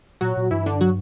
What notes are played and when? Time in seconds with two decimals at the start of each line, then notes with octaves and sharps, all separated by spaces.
0.21 A#2 F#3 F#4
0.37 A#2
0.51 G2 E3 E4
0.66 D3 D4
0.81 F#3 F#4